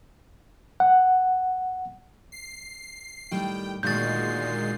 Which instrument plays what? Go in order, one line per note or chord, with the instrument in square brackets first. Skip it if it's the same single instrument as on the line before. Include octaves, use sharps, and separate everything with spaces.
[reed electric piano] F#5
[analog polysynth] C7
[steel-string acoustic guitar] A2 D#3 G3 [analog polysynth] G5
[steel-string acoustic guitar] D2 D#3 F#4 [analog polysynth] A#2 G#3 C7 [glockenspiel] G6 A6